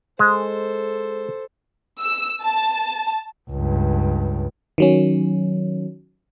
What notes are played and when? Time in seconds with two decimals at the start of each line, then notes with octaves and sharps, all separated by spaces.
0.19 G#3 A4 C5
1.99 E6
2.42 A5
3.51 C#2 G2
4.78 D#3 F#3 C#4